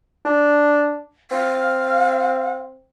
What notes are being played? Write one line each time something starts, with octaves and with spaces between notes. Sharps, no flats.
D4
C4 F5